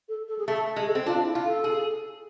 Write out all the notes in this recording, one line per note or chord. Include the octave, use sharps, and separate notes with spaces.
A4
A4
G#4
A3 A4
G#3
G#4
A4
C4
D4 F4
E4
F4
A4
G#4